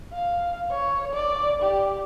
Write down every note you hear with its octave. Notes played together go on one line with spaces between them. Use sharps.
F5
C#5
D5
G4